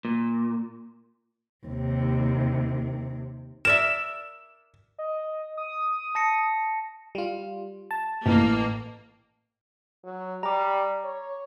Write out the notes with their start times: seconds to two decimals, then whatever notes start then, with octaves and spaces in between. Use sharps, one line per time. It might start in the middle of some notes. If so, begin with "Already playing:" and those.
0.05 A#2
1.66 D#2 C3
3.65 A#4 D5 E5 E7
4.98 D#5
5.57 D#6
6.15 A5 A#6 C#7
7.15 G3 F4
7.91 A5
8.26 A1 A#3
10.04 F#3
10.43 G3 A#5 D6
11.04 C#5